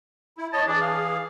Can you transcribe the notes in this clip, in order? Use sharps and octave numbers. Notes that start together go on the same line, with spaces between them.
E4
C#5 D#5 A5
E3 D4 G#4
F5